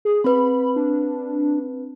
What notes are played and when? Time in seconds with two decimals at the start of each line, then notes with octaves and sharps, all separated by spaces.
0.05 G#4
0.24 C4 B4 B5
0.76 D4